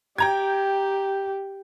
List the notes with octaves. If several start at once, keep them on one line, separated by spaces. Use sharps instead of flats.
G4 G5 A#5 G#6